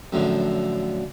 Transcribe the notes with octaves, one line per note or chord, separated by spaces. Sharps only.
F#2 A2 D3 F3